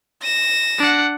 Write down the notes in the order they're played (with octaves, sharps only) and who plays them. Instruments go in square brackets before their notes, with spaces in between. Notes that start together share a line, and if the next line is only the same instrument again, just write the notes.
[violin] A#6 E7
[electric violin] D4 F#5